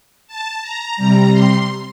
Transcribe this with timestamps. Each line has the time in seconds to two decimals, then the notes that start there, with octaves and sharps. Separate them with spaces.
0.27 A5
0.61 A#5
0.97 C3 G3 A#5
1.31 C6